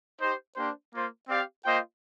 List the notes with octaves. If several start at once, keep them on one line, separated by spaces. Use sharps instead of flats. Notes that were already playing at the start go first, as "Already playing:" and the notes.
D#4 G4 C5
A#3 D4 G4 C5
A#3 F4 C5
C4 G4 D5 F5
A#3 F4 C5 D#5 G5